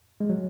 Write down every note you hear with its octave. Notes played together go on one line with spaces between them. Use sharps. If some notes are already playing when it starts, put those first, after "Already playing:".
G#3
F#3